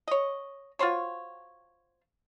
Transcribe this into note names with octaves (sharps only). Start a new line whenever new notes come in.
C#5 D#5
F4 F#4 C5 C#5